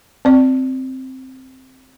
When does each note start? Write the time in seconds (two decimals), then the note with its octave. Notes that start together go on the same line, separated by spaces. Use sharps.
0.25 C4 D5